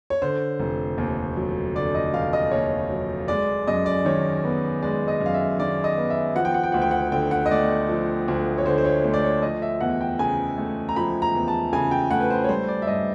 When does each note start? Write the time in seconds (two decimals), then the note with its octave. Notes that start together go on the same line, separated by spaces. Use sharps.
0.10 C#5
0.22 D3 C5
0.60 F1
0.98 D#2
1.36 F#3
1.75 D3 D5
1.95 D#5
2.13 F1 F5
2.33 D#5
2.51 D#2 C#5
2.90 F#3
3.28 G#3 D5
3.67 F#2 D#5
3.86 D5
4.05 D#3 C#5
4.44 B3
4.82 G#3 D5
5.08 D#5
5.21 F#2
5.26 F5
5.34 E5
5.59 D#3 D5
5.84 D#5
5.98 B3
6.10 E5
6.36 F3 F#5
6.45 G5
6.54 F#5
6.63 G5
6.72 D2 F#5
6.82 G5
6.91 F#5
7.12 D3 G5
7.31 F#5
7.46 D#5
7.51 A3 D5
7.89 F3
8.28 D2
8.58 C#5
8.65 D3 C5
8.78 C5
8.85 C#5
9.04 A3 C5
9.14 D5
9.24 C#5
9.42 F3 D#5
9.62 E5
9.81 E2 F#5
10.01 G5
10.19 C#3 G#5
10.58 A3
10.89 A#5
10.96 F3 B5
11.22 A#5
11.35 E2
11.48 A5
11.73 C#3 G#5
11.91 G5
12.11 A3 F#5
12.20 B4
12.30 C5
12.44 C#5
12.49 G3 C5
12.68 D5
12.82 E5
12.87 G2 D#5